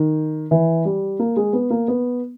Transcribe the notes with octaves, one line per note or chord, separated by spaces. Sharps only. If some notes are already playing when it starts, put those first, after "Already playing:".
Already playing: D#3
E3
G3
A#3
G#3
B3
A#3
B3